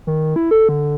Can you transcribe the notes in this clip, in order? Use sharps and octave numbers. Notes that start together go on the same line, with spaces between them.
D#3
E4
A4
D3